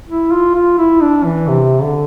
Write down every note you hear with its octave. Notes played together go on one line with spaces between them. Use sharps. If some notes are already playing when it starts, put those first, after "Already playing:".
E4
F4
F4
E4
D4
E3
C3
D3